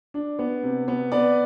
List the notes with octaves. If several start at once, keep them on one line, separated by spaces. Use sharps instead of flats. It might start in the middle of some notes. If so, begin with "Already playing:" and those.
D4
B3
C3
B3
B3 B4 D5